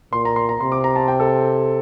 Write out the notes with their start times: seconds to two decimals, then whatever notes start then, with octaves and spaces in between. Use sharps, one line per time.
0.12 A#2 C6
0.25 A#5
0.36 C6
0.49 A#5
0.61 C3 C6
0.72 D6
0.84 A#5
0.96 A5
1.08 G5
1.20 A4